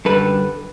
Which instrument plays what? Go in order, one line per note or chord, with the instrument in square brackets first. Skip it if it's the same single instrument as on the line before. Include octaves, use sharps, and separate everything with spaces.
[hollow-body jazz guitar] F#2 D3 G3 A4 B4